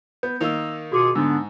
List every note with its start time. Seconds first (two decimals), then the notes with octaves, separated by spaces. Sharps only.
0.23 B3 G6
0.40 D#3 A#3 D#4 E6 F7
0.92 B2 F4 F#4 G#4 D6 C#7
1.15 G#2 D3 B3 D4 E6